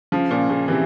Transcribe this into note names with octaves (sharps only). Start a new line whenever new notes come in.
C#3 F3
A#2 C#3
A#2 C#3
C3 E3